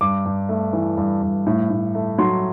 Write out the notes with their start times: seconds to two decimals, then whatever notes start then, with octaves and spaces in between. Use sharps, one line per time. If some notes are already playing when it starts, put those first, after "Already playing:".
0.01 G2 D6
0.26 G2
0.49 A3
0.73 E3
0.97 G2
1.22 G2
1.47 A2
1.70 A2
1.95 A3
2.18 F#3 C6